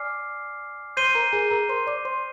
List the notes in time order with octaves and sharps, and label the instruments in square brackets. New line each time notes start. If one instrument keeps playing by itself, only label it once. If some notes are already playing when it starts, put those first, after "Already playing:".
Already playing: [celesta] D5 [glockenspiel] G#5 D6 F6 C7
[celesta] C5 C6 [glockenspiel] G6 C7 D#7 G7
[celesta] A#4 A#5
G#4 G#5
A#4 A#5
C5 C6
D5 D6
C5 C6